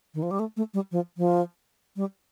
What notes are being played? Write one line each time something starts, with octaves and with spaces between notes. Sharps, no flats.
D#3
F3
G3
A3
A3
G3
F3
F3
G3